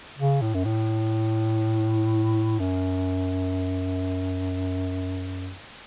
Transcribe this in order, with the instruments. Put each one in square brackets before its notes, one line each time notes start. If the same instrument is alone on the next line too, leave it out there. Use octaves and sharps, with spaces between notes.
[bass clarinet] C#3
A2
F#2
A2
F#2